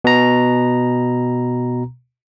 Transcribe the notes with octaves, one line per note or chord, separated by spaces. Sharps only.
B2 A#5